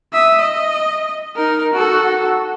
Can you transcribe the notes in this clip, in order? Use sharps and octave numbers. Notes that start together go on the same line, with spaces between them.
E5 D#6
D#5
D#4 A#4
F#4 A4